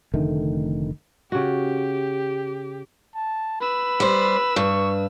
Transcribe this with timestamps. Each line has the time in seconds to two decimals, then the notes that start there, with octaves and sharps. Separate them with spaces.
0.14 F1 D3 D#3 A3
1.32 C#3 F#4 G4
3.15 A5
3.61 B4 B5 E6
4.00 G3 C5
4.56 G2 C#6